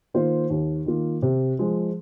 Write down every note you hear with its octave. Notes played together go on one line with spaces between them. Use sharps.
D#3 A#3 F4 C5
D#2
D#3 A#3 F4
C3
F3 G#3